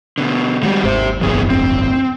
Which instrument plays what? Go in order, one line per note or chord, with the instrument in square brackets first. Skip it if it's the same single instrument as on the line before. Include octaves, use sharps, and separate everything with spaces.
[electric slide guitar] B2 D3
[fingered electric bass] D#3 G#3 [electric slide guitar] G3 F#4 G4
[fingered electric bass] G#1 D#2 [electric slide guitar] G4 C5
[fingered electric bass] D1 G1 F2 [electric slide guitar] D#3 B3 G#4
[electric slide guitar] C4